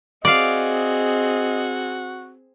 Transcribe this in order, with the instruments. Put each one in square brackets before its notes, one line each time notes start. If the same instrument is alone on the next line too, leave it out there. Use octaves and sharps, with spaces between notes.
[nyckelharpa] C4 G#4 [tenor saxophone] F#4 [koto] D5 F5 [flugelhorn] D#5